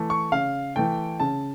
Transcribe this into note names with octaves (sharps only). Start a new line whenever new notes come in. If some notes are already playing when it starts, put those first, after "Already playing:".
Already playing: E3 A3
C#6
C#3 F5
E3 A3 G5
C#3 A5